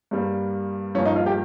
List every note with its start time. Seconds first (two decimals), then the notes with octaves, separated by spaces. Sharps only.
0.11 G2 G3 A#3
0.95 G2 F3 A#3 C#4
1.05 D#4
1.16 F4
1.26 G4